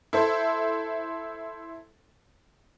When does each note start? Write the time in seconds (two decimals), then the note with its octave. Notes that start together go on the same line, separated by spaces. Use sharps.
0.13 E4 A4 C5